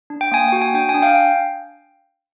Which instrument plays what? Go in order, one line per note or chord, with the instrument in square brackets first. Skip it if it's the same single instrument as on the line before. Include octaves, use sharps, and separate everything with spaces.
[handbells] D4
G5
A#3 G#5
F#4 G5
G#5
D4 G5
G#5
D4
F5 G5